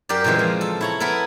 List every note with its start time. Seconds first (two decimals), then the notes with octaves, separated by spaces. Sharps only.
0.09 F#2 G4 A#4 D5
0.24 A#2 C#3 E3 G#3 C4
0.39 F3
0.61 A4
0.81 E4 C#5 A#5
1.00 B3 E4 A4 A#4